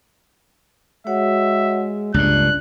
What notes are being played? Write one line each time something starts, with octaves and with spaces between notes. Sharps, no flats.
G#3 F#4 C#5 E5 F#5
C#2 G2 A#3 D4 F#6